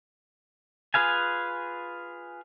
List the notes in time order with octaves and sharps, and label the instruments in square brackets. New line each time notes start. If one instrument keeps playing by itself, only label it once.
[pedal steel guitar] F4 G#4 B4 F5 G#5